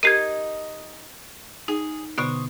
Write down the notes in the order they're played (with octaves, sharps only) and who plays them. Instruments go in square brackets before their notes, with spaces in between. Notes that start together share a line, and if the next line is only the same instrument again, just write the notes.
[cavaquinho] D#4 D#5 [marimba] G4 A#4 [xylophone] G#6 C7 D#7
[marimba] D#4 [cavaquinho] G#4
[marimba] B2 D3 B3 [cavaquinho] C5 C#6 D#6